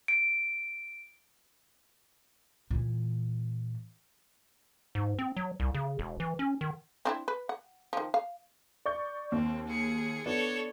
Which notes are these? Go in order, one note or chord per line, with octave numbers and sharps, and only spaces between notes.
D7
A#2 E3
G#2
C4
F#3
C2
C#3
E1
E3
C#4
D#3
C4 D4 E4
B4
F#5
D#3 F3
F5
D5 C#6 G6
D#2 C4
G#4 C#7
B3 D4 A4 C#5